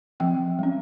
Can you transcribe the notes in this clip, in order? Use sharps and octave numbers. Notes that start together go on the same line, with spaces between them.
F3 C4 G5
G3 C#4